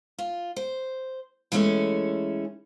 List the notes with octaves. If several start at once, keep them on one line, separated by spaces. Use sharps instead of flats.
F4
C5
E3 G#3 A3 C#4 A4 C#5